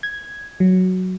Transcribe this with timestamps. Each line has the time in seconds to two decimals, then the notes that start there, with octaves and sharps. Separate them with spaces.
0.03 G#6
0.60 F#3